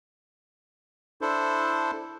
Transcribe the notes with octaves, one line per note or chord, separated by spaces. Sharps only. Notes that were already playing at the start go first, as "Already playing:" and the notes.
D4 E4 A4 C5